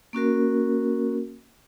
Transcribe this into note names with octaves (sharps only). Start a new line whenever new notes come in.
A#3 C#4 F#4 A#4